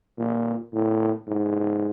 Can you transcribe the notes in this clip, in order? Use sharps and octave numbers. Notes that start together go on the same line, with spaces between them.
A#2
A2
G#2